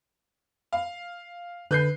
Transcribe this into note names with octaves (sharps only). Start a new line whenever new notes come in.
F5
D3 B4 G6 C7